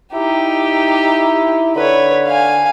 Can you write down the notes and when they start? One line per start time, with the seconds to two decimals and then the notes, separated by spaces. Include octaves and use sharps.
0.13 D#4 E4 G4
1.76 D3 B4 C#5
2.27 F5 G#5